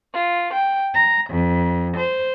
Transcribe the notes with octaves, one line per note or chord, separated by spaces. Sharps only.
F4
G5
A#5
F2
C5